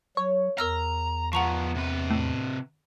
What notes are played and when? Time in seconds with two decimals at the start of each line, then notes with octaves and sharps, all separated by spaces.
0.17 F#3 C#5
0.58 E2 A#4 A#5 E6 F6
1.33 F3 B3 F#5 A#5 C#6
1.75 C3 B4
2.10 A2